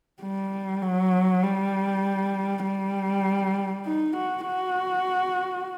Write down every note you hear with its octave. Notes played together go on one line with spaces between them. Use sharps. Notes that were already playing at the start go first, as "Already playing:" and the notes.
G3
F#3
G3
G3
D#4
F#4
F#4